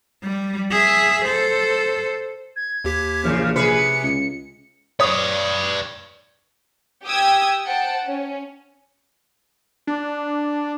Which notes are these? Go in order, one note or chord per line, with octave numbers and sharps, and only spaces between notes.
G3
G#4 E5
A4 C5
G#6
D#2 G4 B6
A#1 C#3 E3 F6
C3 G#4 B4 C#7
C#2 C#7
B4 C#5 D5 D#6
G4 G5 D#6 E6 G#6
C5 F#5 G5 A5
C#4
D4